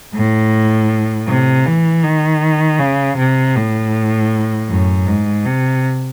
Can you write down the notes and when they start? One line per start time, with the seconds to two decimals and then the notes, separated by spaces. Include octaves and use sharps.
0.14 A2
1.28 C3
1.66 E3
2.04 D#3
2.79 C#3
3.18 C3
3.56 A2
4.69 F#2
5.07 G#2
5.45 C3